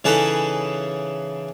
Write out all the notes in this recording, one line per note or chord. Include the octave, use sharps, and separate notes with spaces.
C#3 E3 D#4 G#4 A4 B4